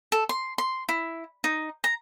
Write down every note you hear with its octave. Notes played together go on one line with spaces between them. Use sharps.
A4
C6
C6
E4
D#4
A#5